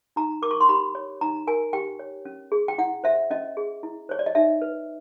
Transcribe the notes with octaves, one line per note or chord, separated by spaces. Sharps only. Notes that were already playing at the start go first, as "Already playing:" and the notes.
D#4 A#5
A#4 D6
C#6
C6
G4 B5
C#5
D#4 A#5
A#4 G#5
G4 G5
C#5
C#4
G#4
G5
E4 F#5
C5 E5
C#4 D#5
G#4
E4
C5 C#5
D5
D#5
D#4 E5
B4